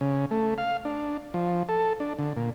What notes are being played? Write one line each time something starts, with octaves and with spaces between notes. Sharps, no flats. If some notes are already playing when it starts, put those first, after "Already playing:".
C#3
A3
F5
D4
F3
A4
D4
D3
A#2